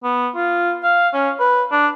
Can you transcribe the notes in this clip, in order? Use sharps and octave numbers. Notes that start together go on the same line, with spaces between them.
B3
F4
F5
C#4
B4
D4